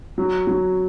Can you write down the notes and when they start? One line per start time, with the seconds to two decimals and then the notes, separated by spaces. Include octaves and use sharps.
0.18 F#3
0.47 F#3